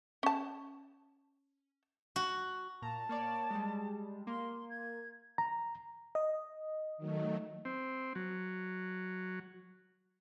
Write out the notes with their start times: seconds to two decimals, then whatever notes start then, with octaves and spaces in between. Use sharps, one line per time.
0.23 C#4 A5
2.16 F#4
2.82 A#2 A5 A#5
3.09 A#3 C#5 D5
3.50 G3 G#3
4.27 A#3 C6
4.69 G#6
5.38 A#5
6.15 D#5
6.98 D#3 F#3 A3
7.65 C4
8.15 F#3